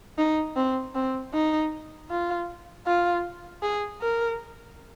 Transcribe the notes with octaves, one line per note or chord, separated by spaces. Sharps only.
D#4
C4
C4
D#4
F4
F4
G#4
A#4